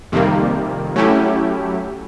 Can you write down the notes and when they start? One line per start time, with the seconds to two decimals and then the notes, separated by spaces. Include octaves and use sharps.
0.12 F2 C3 D#3 G3 A#3
0.96 F#3 A3 C#4 E4 G4